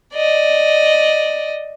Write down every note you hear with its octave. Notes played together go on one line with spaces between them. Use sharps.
D5 D#5